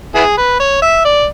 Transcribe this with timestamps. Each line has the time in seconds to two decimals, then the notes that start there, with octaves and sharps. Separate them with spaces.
0.15 B3 E4 G#4
0.38 B4
0.60 C#5
0.82 E5
1.05 D5